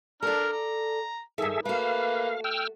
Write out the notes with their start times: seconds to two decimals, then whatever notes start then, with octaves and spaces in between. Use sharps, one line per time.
0.23 D4 A4 D5 A#5 F6
0.53 A#5
1.38 G2 D#3 G#4 A4 E5
1.65 A3 A#3 F#4 B4 F5
2.44 G5 E6 F6